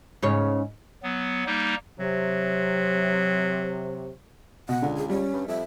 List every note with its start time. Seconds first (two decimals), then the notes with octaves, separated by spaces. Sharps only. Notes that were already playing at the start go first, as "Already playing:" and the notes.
0.22 G#2 C#3 C#5
1.03 F#3 B3
1.46 G3 A#3 D#4
1.99 C3 F#3
4.69 B2 F#5
4.82 C#2 D3
4.97 G#4
5.09 G3 C#4
5.33 G2
5.48 F2 E5